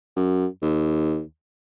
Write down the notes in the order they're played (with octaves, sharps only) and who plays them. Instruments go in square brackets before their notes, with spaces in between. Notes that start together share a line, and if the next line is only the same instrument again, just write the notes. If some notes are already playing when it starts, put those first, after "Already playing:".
[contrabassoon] F#2
D#2